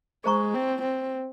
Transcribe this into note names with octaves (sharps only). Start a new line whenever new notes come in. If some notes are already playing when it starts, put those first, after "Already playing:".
G#3 G#4 C5 D#5 A#5 C#6
C4
C4